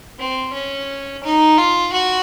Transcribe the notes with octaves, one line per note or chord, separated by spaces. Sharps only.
C4
C#4
D#4
F4
F#4